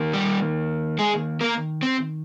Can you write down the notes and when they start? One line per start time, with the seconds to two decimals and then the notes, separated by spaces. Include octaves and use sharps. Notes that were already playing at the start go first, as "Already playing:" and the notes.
Already playing: D#3 A#3
0.13 G3 G4
0.98 G#3 G#4
1.41 A#3 A#4
1.82 C4 C5